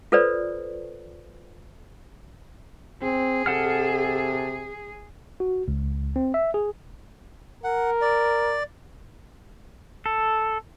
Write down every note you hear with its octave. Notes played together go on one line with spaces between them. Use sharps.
F4 A4 B4 C5 D5
C4 G#4
C3 A4 F#5 F6
F#4
C#2
C4
E5
G#4
A#4 F#5
D5
A4